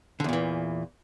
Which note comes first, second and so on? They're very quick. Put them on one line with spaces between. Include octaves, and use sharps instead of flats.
D3 E2 A#2 E3